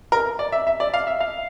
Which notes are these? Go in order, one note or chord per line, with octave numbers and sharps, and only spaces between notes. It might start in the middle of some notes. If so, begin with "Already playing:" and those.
A#4
D5
E5
E5
D5
F5
E5
F5